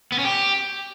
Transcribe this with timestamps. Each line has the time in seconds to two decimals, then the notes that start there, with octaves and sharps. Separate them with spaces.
0.12 B3
0.18 C#4
0.25 G4